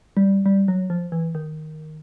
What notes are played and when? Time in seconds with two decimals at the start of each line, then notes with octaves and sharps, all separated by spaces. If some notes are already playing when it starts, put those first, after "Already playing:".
0.17 G3
0.46 G3
0.68 F#3
0.90 F3
1.12 E3
1.35 D#3